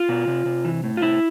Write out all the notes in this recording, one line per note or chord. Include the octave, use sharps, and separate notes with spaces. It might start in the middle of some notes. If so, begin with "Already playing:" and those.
Already playing: F4
B2
C3
C3
E3
A2
F4
C3 E4